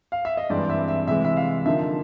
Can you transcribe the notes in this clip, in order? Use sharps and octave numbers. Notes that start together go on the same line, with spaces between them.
F5
E5
D#5
G2 E3 G#3 C4 D5
E5
E5
C3 E3 G#3 E5
E5
F5
D3 F3 A#3 D#4 E5